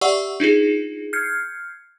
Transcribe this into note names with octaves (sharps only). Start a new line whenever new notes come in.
G4 D5 E5 F#5 C#6 E6
D4 D#4 F4 G#4
F6 G6 G#6 C7 C#7